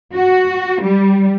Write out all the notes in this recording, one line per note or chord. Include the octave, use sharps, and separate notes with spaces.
F#4
G3